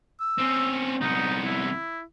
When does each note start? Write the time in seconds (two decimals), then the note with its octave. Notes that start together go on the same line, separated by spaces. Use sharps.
0.20 E6
0.38 C4 C#4
1.01 C2 B3 D#4
1.46 E4